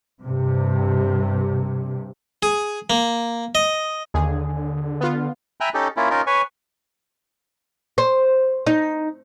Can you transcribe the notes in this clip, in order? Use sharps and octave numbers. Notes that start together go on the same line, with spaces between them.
G2 C3
G#4
A#3
D#5
D#2 D3 G#4
B3 F4
E5 G5 G#5 A#5 B5 F#6
C#4 D#4 G4 A4
A#3 C#4 E4 F4
C#4 D#4 F4 A#4
B4 C#5 G#5 C#6
C5
D#4